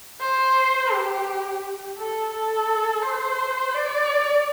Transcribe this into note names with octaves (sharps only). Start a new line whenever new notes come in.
C5
G4
A4
A4
C5
D5